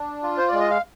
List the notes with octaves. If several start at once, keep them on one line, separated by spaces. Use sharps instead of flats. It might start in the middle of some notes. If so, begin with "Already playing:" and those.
Already playing: D4
F4
C5
G#3 D5
D#5
F5